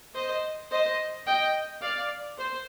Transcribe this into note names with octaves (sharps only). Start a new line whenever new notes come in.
C5 D#5
C5 D#5
D#5 G5
D5 F5
C5